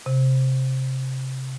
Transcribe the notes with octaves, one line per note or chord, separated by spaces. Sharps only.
C3